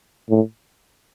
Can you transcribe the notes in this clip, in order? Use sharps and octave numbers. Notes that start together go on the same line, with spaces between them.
A2